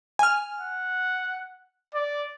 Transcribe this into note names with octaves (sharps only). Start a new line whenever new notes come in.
G#5 F6
F#5
D5